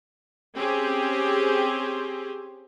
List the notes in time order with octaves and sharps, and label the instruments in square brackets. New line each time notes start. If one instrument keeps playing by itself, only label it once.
[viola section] C4 C#4 G4 G#4 C5